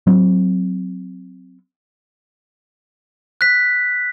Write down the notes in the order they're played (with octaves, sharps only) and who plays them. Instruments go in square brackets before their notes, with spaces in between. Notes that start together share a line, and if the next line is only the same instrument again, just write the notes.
[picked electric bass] F#3 C4
[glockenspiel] F#6 B6